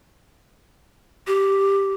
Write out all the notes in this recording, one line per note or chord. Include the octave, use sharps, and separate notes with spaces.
G4